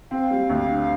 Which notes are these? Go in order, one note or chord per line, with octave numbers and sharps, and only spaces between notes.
C4 F5
G3
D2
D3